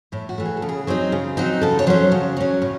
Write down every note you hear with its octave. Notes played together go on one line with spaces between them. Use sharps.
A2 E4
F#4
E3 A3
G#4
A4
C#3
G#4
F#3 C4 D#4
C#3
F#3 C4 D#4
C#3 A4
C#5
F#3 C#4 C5
C#3
F#3 C#4
A2